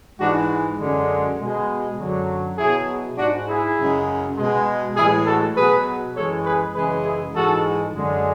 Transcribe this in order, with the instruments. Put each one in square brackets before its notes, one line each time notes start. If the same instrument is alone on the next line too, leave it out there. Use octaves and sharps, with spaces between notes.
[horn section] G#2 E3 G#3 D4 F#4
F#2 D3 G#3
B2 G#3
F#2 D3 F#3
B2 F#3 E4 G#4
G#2 G#3 D4 F#4
E4 G#4
F#2 C#3 G#3
B2 G#3
A2 E3 G#3 E4 G#4
F#4 A4
B2 F#3 G#4 B4
F#2 E3 G#3 A4 C#5
G#4 B4
F#2 C#3 E3 G#3 G#4 B4
E4 G#4
G#2 E3 G#3 F#4 A4
F#2 D3 G#3